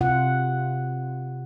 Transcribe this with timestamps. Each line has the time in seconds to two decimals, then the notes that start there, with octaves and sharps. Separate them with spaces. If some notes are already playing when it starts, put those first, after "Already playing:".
0.01 C3 F4 F#5